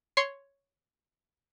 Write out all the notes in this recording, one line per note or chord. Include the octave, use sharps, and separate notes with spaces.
C#5 C6 C7 C#7